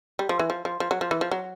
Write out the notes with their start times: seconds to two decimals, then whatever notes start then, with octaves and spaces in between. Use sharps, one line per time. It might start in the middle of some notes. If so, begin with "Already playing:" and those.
0.19 G3
0.29 F3
0.39 E3
0.50 F3
0.65 F3
0.80 F3
0.91 F#3
1.01 F3
1.11 E3
1.21 F3
1.31 F#3